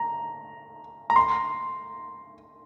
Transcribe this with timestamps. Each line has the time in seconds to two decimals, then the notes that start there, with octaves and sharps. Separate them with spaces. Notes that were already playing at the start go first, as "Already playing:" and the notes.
Already playing: A#5
1.10 A#5
1.16 C6